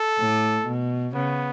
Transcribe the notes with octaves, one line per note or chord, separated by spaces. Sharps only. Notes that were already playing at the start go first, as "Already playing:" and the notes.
Already playing: A4
A2
B2
C#3 B3